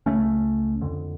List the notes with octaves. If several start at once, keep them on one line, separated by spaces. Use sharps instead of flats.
C#2 C#3 A3 C#4
F2 D3